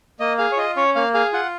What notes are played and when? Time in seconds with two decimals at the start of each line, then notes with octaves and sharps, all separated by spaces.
0.20 A#3 D#5
0.38 G#4 F5
0.52 C#5
0.57 F4 D#5
0.76 C#4 C#5
0.95 A#3 F5
1.14 G#4 F5
1.33 F4 F#5